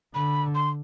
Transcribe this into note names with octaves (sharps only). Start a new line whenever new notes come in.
D3 B5
C6